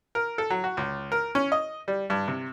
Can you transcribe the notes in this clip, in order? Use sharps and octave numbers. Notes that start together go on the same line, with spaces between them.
A#4
A4
F#3
F#4
C#2
A#4
C#4
D#5
G3
G2
C3